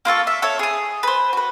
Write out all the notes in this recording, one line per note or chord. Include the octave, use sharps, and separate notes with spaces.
A#3 F4 A4 C#6
E5
A4 C#5 E5
G#4 D#6
B4 C5
F#4 B4